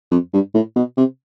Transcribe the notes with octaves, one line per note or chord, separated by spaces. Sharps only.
F2
G2
A2
B2
C3